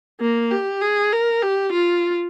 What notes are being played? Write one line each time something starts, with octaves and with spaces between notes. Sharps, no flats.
A#3
G4
G#4
A#4
G4
F4